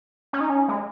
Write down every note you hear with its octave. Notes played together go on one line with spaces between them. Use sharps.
C#4
D#4
C#4
G#3